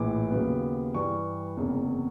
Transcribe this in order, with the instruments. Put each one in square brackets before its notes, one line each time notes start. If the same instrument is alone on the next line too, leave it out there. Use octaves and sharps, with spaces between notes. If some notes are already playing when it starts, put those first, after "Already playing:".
Already playing: [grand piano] A#1 A2 E3 D6
D#2 C#3 F#3 B3
G2 E3 G3 C#6
F#1 E2 C3